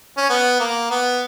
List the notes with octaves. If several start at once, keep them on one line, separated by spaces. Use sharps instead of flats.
C#4
B3
A#3
B3